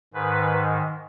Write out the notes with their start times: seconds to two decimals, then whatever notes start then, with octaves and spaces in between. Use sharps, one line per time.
0.14 G#2 D#3 B4